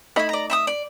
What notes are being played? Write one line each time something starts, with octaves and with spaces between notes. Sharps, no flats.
A3 D#4 E4 D#5 B5
D5 A#5
E5 B5 D#6
D5